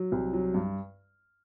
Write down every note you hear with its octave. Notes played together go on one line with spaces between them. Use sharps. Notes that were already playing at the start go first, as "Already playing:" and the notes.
Already playing: F#3
C2
F#3
G2